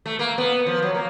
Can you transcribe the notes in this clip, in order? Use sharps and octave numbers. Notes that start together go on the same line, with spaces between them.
A3
A#3
B3
F3
F#3
A#3